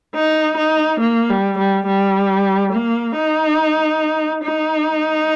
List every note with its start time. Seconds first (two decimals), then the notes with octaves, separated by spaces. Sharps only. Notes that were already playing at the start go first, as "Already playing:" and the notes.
0.15 D#4
0.57 D#4
1.00 A#3
1.29 G3
1.58 G3
1.86 G3
2.72 A#3
3.16 D#4
4.44 D#4